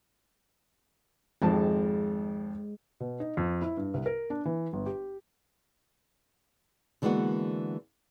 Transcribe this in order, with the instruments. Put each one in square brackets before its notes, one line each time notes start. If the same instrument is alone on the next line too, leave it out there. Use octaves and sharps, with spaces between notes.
[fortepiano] G#1 F2 A5 [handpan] G#3
[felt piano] B2
D#4
F2
E4
G2
C2
A#4
D4
E3
G1
G4
[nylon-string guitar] D3 E3 G#3 A#3 B3 F#4